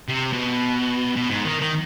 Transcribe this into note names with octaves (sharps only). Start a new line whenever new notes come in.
C3
B2
B2
G#2
D#3
D#3